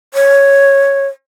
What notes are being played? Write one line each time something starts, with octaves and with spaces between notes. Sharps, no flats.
C#5